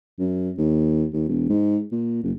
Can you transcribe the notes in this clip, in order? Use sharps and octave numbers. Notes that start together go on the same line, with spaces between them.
F#2
D#2
D#2
E1
G#2
A#2
F#1